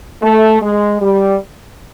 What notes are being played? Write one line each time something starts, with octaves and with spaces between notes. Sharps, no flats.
A3
G#3
G3